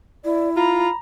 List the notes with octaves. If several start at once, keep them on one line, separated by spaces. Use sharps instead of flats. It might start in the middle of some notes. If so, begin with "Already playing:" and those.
E4 D5
F4 A#5 B5